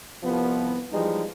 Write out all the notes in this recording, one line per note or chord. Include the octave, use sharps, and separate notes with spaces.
C2 F3 B3
E3 F3 G3 G#3 D#4 G#4